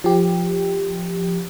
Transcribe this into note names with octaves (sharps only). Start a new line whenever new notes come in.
F3 G4